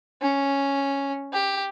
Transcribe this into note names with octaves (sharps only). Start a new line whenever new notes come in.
C#4
G4